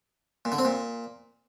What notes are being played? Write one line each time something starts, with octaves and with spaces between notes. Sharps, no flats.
A#2
D3
C4
A#2